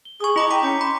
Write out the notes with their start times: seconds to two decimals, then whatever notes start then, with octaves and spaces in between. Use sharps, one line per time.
0.05 G7
0.20 G#4 C#6 D#6
0.36 E4 D#5 A#5 B5 C#6 D6
0.51 G5 A#5 B6
0.63 C#4 D6 G6 C#7
0.81 B5 C6